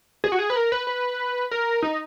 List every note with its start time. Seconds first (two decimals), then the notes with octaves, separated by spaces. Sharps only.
0.24 G#4
0.32 F#4
0.39 G#4
0.50 B4
0.56 A#4
0.72 B4
0.87 B4
1.51 A#4
1.82 D#4